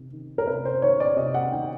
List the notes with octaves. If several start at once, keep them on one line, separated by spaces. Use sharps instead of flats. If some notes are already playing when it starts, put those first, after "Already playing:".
Already playing: C3 D#3
D#3
A#4
C3 B4
C5
D#3 C#5
D5
C3 D#5
F#5
D#3 G5